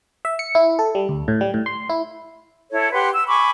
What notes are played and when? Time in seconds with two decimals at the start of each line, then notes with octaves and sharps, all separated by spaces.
0.25 E5
0.39 C#7
0.55 E4
0.79 A4
0.95 G3
1.09 D2
1.28 A2
1.41 G3
1.54 A2
1.66 C6
1.90 E4
2.71 E4 A4 C#5
2.92 G4 B4 F#5 C6
3.12 E6
3.27 G#5 B5 C#6 D6